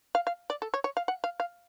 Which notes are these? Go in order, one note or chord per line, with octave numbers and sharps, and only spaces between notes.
F5
F5
D5
A4
C#5
C#5
F5
F#5
F5
F5